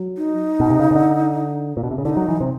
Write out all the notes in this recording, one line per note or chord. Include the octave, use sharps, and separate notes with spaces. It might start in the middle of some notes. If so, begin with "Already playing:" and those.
Already playing: F#3
D#4
B2
C3
C#3
C#3
D3
A#2
B2
C3
C#3
D3 E4
D#4
F#3
E3
C3